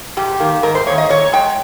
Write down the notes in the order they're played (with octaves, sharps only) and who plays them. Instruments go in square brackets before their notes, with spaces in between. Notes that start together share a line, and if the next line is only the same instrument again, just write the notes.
[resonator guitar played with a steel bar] G#2 G4
D#3 A#3
G#2 A#4
C5
D#3 A#3 C#5
D#5
A#2 C#5
G#3 G5